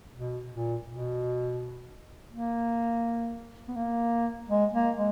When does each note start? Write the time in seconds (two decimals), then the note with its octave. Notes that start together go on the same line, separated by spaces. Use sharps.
0.15 B2
0.52 A#2
0.88 B2
2.32 A#3
3.68 B3
3.76 A#3
4.49 G#3
4.73 A#3
4.97 G#3